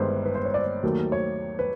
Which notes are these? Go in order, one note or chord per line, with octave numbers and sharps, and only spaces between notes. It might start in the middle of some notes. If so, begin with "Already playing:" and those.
Already playing: G1 G2 D#3 G#3 B4 C5
B4
C5
C#5
D5
D#2 D#3 F#3 A3
C#5
B4